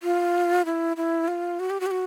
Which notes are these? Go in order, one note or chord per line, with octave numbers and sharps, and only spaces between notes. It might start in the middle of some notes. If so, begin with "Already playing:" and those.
F4
E4
E4
F4
F#4
G4
F#4
G4
F#4